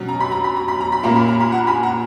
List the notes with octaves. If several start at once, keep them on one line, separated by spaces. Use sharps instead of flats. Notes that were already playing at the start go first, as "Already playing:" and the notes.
Already playing: B2 F#3 C#4
A#5
B5
A#5
B5
A#5
B5
A#5
B5
A#2 A#3 C#4 A#5
B5
A#5
B5
F#5 A#5
G#5 B5
F#5 A#5